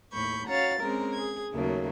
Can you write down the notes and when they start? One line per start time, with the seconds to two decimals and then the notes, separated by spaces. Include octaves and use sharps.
0.13 D#2 A2 B5 C#6 G6
0.48 C#4 F#4 C#5 F5 A#5 A6
0.79 G#3 C4 C#4 A#4 A#5
1.13 G#4 G#6
1.53 D#2 C#3 F#3 A3 A#3